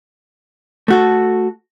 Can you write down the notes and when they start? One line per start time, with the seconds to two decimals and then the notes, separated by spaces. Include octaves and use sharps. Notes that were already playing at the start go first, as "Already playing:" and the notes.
0.88 A3 F#4 A4